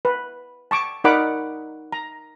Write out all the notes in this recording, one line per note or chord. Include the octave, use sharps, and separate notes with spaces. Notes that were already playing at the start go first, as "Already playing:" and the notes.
B4
A5 C#6 D6
D#4 A#4 D5 F#5 B5 D6
A#5